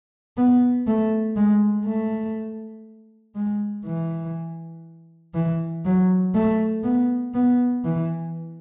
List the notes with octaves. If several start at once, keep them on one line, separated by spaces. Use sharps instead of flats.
B3
A3
G#3
A3
G#3
E3
E3
F#3
A3
B3
B3
E3